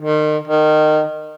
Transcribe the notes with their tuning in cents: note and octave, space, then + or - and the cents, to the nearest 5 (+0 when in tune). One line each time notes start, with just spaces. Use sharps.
D#3 -35
D#3 -20